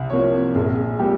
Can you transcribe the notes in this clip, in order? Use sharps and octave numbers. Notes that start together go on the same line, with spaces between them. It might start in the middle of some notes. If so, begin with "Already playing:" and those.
Already playing: C2
C3 F3 A#3 C#5
A#1 G#4
A#2 G3 G4